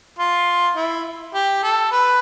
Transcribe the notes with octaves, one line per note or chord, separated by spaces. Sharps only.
F4
E4
G4
A4
B4